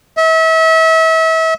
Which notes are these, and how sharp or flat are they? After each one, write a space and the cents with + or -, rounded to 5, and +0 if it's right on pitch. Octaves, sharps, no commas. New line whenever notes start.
E5 -35